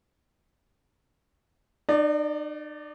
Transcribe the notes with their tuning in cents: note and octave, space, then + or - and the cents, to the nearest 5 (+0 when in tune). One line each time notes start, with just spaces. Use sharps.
D#4 -45 D5 +0